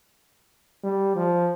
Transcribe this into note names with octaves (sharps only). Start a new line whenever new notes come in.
G3
F3